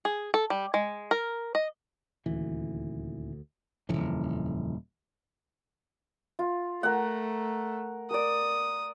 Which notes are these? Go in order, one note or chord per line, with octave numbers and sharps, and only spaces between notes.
G#4
A4
G3
G#3
A#4
D#5
D#1 D2 E3
D#1 G#1 F2 C#3 E3
F4
A3 A#4 F#5
A#4 D5 D#6